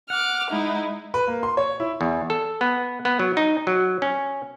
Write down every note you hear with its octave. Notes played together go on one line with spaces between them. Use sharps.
F#5 D6 F6
G#3 D#4 E4
B4
A#3
C6
C#5
E4
E2
A4
B3
B3
F#3
D#4
F#3
C#4